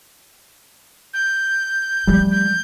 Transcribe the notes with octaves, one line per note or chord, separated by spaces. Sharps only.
G6
F3 G3 A3
G6